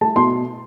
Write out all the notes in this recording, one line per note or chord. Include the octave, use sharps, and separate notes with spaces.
A3 A5
B2 C6